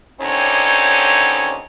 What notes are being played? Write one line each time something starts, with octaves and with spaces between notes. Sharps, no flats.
D#2 D3 C4 C#4 D#4 C#5